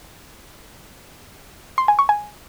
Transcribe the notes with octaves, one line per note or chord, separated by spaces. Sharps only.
C6
G#5
C#6
G#5